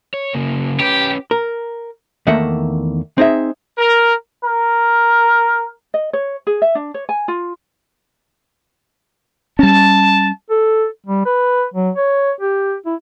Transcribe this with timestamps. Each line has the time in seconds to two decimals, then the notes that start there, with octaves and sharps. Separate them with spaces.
0.14 C#5
0.34 C#3 A#3
0.80 C#4 G4 B4
1.31 A#4
2.27 E2 D#3 A3 A#3 E5 F#5
3.18 C4 D#4 G#4 E5
3.78 A#4
4.45 A#4
5.94 D#5
6.13 C#5
6.47 G#4
6.62 E5
6.75 D4
6.94 C#5
7.09 G#5
7.28 F4
9.59 G3 C#4 A5
10.50 A4
11.06 G3
11.25 B4
11.74 F#3
11.96 C#5
12.41 G4
12.86 E4